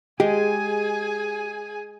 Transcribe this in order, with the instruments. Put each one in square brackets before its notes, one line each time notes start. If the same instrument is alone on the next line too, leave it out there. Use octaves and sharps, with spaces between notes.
[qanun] G#3 [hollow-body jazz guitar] G4 [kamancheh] G#4 G#5